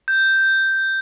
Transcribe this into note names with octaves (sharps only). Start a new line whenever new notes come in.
G6